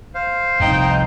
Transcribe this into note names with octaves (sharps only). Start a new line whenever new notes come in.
C5 F5
F1 C2 F2 D#4 G5